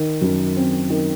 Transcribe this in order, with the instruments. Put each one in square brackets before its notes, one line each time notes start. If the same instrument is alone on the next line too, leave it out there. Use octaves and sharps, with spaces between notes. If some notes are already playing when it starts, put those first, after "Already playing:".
Already playing: [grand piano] D#3
F#2
C4
D#3